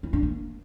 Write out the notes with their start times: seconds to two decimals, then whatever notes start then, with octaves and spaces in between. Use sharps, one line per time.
0.03 E4
0.13 D4
0.23 A#3